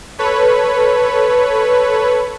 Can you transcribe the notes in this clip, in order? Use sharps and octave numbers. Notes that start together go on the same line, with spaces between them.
A4 B4 C#5